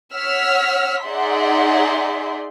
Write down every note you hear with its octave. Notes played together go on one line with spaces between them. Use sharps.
C#5 F#5 E6 F6 B6
D#4 G#4 D5 E5 F#5 C6